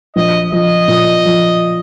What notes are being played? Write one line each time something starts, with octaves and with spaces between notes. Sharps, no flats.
A#1 D#5
F3 D#5
A#2
F3